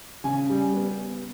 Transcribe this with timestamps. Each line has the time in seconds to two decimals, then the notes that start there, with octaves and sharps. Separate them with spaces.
0.24 C#3 G#5
0.50 G3
0.74 B3